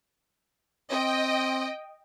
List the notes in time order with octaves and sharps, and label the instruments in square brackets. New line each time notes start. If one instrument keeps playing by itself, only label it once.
[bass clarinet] C4 [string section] D#5 G5